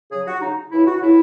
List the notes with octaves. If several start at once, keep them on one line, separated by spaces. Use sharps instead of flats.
C#3 F#3 G#4
F#4
C#3 F#3 D#4
C#3 E3 E4
F#4
C#3 E3 E4